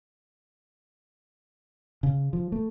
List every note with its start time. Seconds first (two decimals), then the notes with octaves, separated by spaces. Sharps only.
2.03 C#3
2.33 F3
2.52 A3